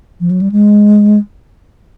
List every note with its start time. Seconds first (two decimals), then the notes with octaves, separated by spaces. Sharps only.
0.20 F3
0.31 F#3
0.41 G3
0.52 G#3